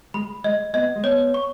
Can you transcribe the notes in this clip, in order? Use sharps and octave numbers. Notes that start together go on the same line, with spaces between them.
G#3 B5
G#3 D#5
B3 D#5
G#3
B3 C#5
C#6